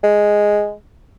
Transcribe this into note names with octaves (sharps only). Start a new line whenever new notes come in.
G#3